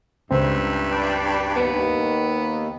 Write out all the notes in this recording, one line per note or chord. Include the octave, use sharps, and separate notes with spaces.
C#2 G2 C4 E5
B4 D5 G5
D#2 D#3 B3